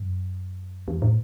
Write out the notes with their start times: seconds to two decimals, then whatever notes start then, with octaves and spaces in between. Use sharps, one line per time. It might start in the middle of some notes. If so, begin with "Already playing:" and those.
Already playing: F#2
0.88 E2
1.02 A2